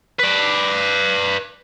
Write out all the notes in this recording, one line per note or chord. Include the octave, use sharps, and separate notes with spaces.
B4 D5